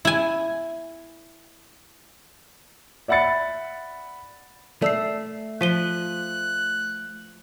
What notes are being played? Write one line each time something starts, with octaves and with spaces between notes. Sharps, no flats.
E4 G#5
D5 E5 F#5 B5 A6 C#7
A3 D5 E6 C7
F3 F#6 B6 D#7 G7